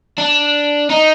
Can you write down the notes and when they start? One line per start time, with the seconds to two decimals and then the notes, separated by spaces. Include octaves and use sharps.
0.18 D4
0.90 D#4